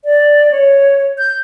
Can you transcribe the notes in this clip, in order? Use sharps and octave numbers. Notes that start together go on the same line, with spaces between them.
D5
C#5
G6